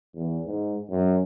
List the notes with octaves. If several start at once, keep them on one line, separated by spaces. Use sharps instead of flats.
E2
G#2
F#2